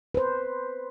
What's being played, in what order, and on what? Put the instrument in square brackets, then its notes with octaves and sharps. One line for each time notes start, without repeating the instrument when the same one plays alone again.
[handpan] B4 C5